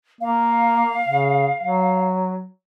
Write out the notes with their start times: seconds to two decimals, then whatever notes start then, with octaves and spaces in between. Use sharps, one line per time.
0.21 A#3 F5
1.08 C#3
1.63 F#3